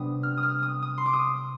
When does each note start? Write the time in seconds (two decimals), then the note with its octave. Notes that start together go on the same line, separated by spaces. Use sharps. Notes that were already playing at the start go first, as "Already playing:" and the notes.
Already playing: C3 G3 B3 D4 D#6
0.23 F6
0.37 D#6
0.43 F6
0.63 D#6
0.82 D#6
0.98 C6
1.06 D6
1.13 D#6